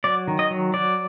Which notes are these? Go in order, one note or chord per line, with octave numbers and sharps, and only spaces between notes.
F#3 D5
D#3
D#5
F#3
F#3 D5